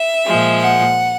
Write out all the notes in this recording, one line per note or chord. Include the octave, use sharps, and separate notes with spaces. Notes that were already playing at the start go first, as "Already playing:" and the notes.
Already playing: E5
A#2 F3 G#3
F#5